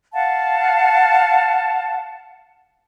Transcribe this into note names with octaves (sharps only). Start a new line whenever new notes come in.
F5 F#5 A5